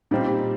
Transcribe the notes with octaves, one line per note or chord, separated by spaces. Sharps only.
A#2 G3 C4 D#4
G4